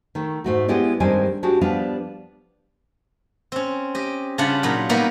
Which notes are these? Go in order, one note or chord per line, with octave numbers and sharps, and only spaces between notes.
D#3 A3
G#2 A3 F#4
G#3 B3 E4 G4 D5
G2 D#3 G3 G#3 C4 G#5
G#3 D4 F#4 G4
F3 G3 B3 D4 B4 F5
C4 C#4
G4 D#5
C#3 G3 D4 F4 F#5 B5
A#2 F#3 D#4 B5
G3 A#3 B3 D#4 F#4 G4